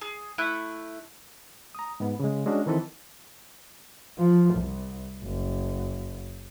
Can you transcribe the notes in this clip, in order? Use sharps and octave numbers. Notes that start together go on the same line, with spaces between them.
G#4
A3 E4 F#6
A#5 D#6
G#2 B3
C#3 G#3
G#3 C#4 D4 F#4
D#3 E3 C4 A4 B4
F3
C2
F#1